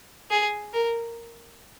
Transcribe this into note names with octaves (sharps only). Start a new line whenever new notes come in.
G#4
A#4